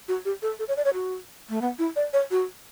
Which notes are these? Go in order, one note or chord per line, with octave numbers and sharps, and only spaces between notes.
F#4
G4
A4
A4
C#5
D5
C#5
F#4
A3
B3
E4
D5
C#5
F#4